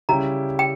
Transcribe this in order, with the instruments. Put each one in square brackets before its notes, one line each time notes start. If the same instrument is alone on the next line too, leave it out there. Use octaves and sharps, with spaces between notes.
[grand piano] C#3 G3 C#4 E4 G4 [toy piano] A#5
[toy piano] G5